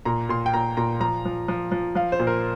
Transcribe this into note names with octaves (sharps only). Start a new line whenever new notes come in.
A#2 A#5
A#2 C6
G5
A#2 A#5
A#2 A#5
F3 A#5
F3
F3
F3
F3 F5
C5
A#2
A#4